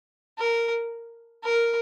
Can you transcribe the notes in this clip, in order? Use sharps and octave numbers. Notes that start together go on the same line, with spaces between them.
A#4
A#4